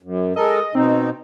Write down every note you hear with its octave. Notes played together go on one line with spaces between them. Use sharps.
F#2
G#3 A4 A#4 D#5
B2 C4 D#4